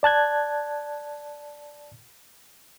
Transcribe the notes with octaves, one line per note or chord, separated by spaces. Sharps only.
D5 A5 F#6 G#6